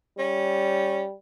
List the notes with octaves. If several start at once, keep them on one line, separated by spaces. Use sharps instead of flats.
G3 C#4